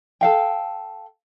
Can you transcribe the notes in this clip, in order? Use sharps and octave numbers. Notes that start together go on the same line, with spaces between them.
A4 F5 G5